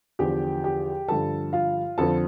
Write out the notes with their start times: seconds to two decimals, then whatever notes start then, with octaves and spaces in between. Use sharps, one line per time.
0.19 E2 D3 F3 G4 G5
0.64 G4 G5
1.08 G2 D3 F3 A4 A5
1.53 F4 F5
1.98 F2 D3 F3 A4 A5